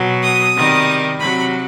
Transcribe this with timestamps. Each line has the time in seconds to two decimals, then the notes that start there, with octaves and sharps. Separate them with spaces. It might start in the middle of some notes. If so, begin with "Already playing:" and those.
Already playing: B2 F#3
0.23 D#6
0.56 C3 D#3 G3
1.19 C3 F#3 B5